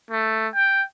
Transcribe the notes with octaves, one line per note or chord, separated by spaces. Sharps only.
A3
G5